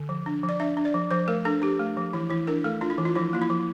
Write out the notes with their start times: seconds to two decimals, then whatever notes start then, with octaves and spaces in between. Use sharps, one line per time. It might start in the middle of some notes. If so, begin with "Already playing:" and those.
Already playing: D3
0.09 F3
0.26 D4
0.44 F3
0.49 D5
0.60 D4 E5
0.77 D4
0.85 D5
0.94 F3
1.11 F3 C5
1.28 A3 A#4
1.45 D4 A4
1.62 D4 G4
1.80 A3
1.97 F3
2.13 E3 E4
2.30 E3 E4
2.47 D4 A#4
2.64 A3 A4
2.81 D4 F4
2.90 E4
2.98 E3
3.05 F4
3.15 F3 E4
3.33 A#3 F4
3.42 E4
3.50 F3